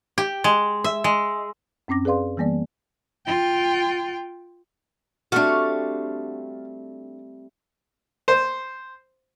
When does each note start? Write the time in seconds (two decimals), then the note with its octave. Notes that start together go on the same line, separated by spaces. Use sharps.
0.18 G4
0.44 G#3
0.84 E5
1.04 G#3
1.88 F#2 C4 C#4 D6 A#6
2.05 G#4 B4 D5 F5 C6
2.37 E3 G3 A#3 B3 D5
3.26 F4 G5
5.32 G3 A3 C4 D4 F#4 F5 C#6
8.28 C5